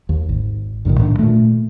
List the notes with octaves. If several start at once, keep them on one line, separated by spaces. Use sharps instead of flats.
D#2
G#1
B1 G2 A#2 D#3
A2 D#3 D4
A#2 A3